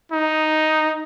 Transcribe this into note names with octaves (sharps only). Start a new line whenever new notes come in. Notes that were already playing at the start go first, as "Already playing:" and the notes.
D#4